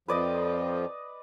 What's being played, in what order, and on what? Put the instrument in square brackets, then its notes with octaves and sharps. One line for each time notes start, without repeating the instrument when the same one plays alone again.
[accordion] F2 F3 [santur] B4 D5 D#5